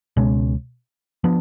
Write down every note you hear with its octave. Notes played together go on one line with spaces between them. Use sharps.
C#2 B2 G#3 C#4
F3 B3 D4